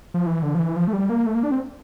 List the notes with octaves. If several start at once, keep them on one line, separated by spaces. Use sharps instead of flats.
F3
E3
D3
F3
E3
F3
A3
G3
A#3
A3
A#3
D4
C4